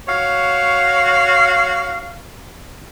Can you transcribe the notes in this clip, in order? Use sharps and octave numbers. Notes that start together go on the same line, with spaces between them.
F#4 C#5 F5